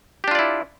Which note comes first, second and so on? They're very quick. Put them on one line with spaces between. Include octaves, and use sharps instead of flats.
G4 D4 F4 D5 E4